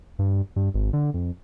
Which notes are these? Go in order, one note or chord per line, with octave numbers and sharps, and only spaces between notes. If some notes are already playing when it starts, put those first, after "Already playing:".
G2
G2
G#1
D3
F2